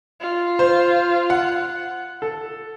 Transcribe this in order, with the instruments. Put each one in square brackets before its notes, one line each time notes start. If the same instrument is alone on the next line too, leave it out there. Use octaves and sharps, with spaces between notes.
[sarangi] F4
[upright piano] C5
F#5
A4